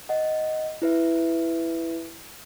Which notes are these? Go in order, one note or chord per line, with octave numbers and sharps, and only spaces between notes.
D#5 F#5
E4 B4 E5